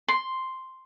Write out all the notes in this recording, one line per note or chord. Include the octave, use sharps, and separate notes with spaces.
C6